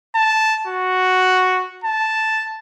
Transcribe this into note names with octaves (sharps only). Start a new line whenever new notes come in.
A5
F#4
A5